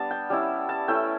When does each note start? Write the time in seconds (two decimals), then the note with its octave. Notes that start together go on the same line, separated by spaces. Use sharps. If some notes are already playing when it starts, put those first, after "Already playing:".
Already playing: G3 B3 D4 A5
0.11 G5
0.30 G3 C#4 E4
0.69 A5
0.88 A3 C#4 E4 G5